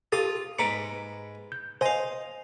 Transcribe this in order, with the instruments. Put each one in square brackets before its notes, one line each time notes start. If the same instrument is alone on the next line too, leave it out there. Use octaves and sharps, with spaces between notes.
[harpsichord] F4 D#6 [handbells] G4 A4 A6
[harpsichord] G#2 B4 D6 [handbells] A#5 C#7
[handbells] G6
[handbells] C5 G#5 [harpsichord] D#5 F5